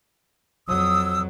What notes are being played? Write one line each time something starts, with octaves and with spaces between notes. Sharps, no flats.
F2 F#3 D#6 E6